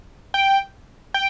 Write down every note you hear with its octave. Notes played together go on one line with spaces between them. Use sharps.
G5
G5